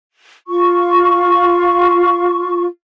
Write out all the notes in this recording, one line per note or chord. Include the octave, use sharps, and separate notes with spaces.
F4 C#6